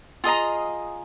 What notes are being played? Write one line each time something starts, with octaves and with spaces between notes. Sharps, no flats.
F4 G#4 D#5 A#5